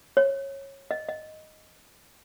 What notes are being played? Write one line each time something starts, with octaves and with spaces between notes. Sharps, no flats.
C#5
D#5
D#5